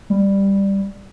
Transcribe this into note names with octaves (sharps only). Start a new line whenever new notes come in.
G3